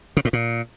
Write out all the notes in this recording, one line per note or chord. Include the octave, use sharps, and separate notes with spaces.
C#3
A2
A#2